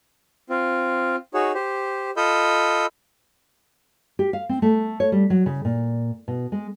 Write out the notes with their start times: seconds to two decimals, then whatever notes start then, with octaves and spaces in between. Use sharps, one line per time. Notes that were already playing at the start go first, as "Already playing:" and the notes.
0.50 C4 F4
1.34 D#4 F#4 G#4 C#5
1.55 G4 C5
2.17 F4 A4 D#5 B5 E6 G6
4.19 G4
4.33 F5
4.49 C4
4.62 A3
5.00 C#5
5.12 G3
5.30 F#3
5.46 C#3
5.65 A#2
6.28 B2
6.52 G#3